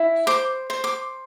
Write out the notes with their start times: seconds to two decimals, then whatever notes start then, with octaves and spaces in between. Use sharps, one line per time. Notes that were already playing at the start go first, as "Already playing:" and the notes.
Already playing: E4
0.27 C5 D6
0.70 C5
0.84 D6